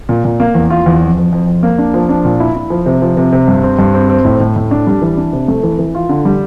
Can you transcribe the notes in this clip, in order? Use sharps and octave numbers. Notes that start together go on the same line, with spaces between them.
A#2
A#2
A#3
E2
F4
E2
F2
F2
F2
F2
A#3
D4
F3
D4
A#2
E4
E4
F3
C3
F3
C3
C3
G2
C4
G2
C4
C4
A2
A2
A2
D4
G3
E3
D4
C3
A3
E3
E3
F4
D3
G3